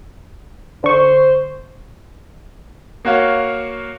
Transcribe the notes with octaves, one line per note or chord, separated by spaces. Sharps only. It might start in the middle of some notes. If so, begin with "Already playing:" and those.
D3 C5 C#6
A#3 F#4 C#5 F5